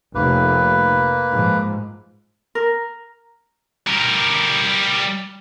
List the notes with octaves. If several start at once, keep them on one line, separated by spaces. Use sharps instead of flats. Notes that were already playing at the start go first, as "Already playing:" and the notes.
F1 A#3 B4
G#2 F3
A#4
G3 A#4